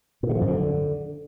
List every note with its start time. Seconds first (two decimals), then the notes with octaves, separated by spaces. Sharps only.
0.23 A#2
0.29 D3
0.35 F3
0.41 F#2
0.47 D3